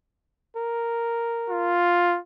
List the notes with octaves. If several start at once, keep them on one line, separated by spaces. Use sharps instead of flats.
A#4
F4